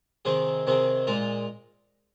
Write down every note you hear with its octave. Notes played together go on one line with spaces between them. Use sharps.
C3 D#3 C4 G#4
C3 D#3 C4 G#4
A#2 G#3 F4 A#4